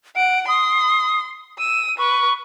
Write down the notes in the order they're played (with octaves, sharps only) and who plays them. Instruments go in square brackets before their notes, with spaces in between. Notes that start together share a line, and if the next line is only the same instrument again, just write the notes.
[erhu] F#5 [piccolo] D7
[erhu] C6 [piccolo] D#6
[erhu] E6 [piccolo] D#7
[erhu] B4 [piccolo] C#6